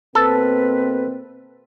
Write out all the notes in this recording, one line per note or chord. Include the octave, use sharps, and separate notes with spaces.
B2 A#3 C4 A4 B4